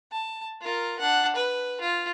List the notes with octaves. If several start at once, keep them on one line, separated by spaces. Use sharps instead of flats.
A5
F4 A#4
D4 F#5
B4
F4